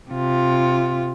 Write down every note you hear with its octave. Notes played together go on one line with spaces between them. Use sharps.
C3 F4